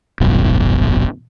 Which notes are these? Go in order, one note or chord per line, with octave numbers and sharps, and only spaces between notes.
D#1 G#1 F#2 B2